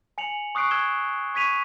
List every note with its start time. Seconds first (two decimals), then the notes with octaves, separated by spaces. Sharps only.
0.18 G#5 C#7 F7 F#7
0.55 C#6 D#6 F#6 C7 D7
0.71 E6 G#6 E7 G7
1.35 C#6 G#6 B6 D#7 F7